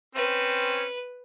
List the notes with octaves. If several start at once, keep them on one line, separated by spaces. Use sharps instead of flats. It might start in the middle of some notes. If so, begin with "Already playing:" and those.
C4 C#4 B4